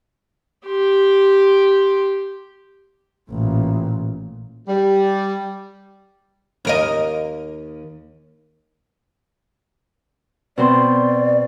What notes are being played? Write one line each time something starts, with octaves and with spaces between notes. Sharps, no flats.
G4 C6
A1 A#2
G3
D#2 A#4 D#5
B2 C4 D5 C6